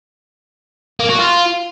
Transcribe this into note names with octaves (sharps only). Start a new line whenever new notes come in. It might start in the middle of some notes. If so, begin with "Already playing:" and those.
A#3
F#4
F4